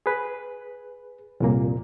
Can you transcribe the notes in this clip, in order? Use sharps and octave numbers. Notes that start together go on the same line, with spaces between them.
G#4 B4
C2 F2 A#2 A#3